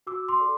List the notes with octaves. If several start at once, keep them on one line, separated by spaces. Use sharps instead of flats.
F#4 D6 E6
C6 D6
A4 D5